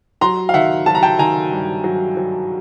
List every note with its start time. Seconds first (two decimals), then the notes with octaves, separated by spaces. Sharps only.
0.21 F#3 A#5 C6
0.49 F5
0.54 D#3 E5 F#5
0.86 F#3 A5
0.95 A#5
1.03 G5 A5
1.19 D#3 G#5 A#5
1.52 G2
1.84 F#3
2.17 F#3